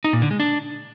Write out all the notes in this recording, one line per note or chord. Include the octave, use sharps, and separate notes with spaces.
D#4
A#2
D3
G#3
D4